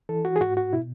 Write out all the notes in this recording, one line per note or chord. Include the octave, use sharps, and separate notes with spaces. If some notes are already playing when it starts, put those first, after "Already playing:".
E3 A4
F#4
G#4
G#2 F#4
F#4
B2 E4